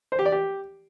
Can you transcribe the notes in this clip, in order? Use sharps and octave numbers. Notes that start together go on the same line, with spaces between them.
C5
G4
D5
G4